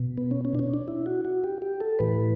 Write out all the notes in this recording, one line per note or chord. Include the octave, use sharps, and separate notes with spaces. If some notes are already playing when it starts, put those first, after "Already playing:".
Already playing: B2
B3
C#4
C#4
D4
C#4
D4
E4
F#4
F#4
G4
G4
A4
A2 E3 B4